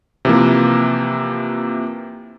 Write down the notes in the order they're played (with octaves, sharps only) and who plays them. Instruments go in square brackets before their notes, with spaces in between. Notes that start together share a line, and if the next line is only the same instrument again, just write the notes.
[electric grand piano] C3 E3 F3 A#3